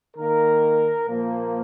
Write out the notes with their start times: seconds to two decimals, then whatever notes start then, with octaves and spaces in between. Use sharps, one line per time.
0.17 D#3 A#3 A#4
1.06 A#2 F3 A#3